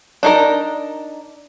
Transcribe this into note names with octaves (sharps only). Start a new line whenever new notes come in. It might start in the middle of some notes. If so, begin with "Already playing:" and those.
D4 D#4 A#4